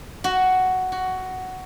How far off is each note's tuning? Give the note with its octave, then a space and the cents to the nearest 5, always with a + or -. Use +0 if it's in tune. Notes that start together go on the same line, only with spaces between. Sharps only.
F#4 +5
F#4 +10